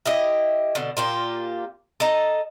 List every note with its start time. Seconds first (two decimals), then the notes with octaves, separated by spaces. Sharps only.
0.06 E4 G4 D#5
0.75 B2 D3
0.97 A#2 F4 G4
2.00 A4 D#5 A#5